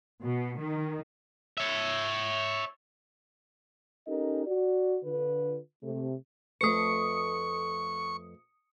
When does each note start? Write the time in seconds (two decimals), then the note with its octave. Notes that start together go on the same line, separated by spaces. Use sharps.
0.22 B2
0.58 D#3
1.57 C#5 E5
4.07 C#4 D#4 G4 A4 A#4 D#5
4.46 F#4 D5
5.04 D3 F4 B4
5.82 C3 A3
6.61 F2 A3 B4 C#6 D#6 C#7